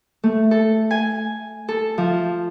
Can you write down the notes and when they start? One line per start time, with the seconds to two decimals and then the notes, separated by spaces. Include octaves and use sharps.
0.23 A3
0.51 A4
0.91 G#5
1.68 A4
1.98 F3